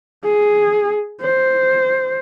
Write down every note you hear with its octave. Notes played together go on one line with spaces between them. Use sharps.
G#4
C5